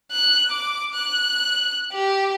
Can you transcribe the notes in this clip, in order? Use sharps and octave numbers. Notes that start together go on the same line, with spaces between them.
F#6
D6
F#6
G4